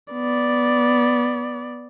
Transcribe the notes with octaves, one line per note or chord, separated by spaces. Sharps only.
B3 D5